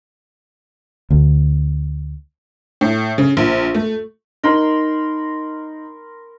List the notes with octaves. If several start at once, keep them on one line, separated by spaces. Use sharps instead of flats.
D2
A2
C#3
A#1
A3
D#4 A#4 B5 C6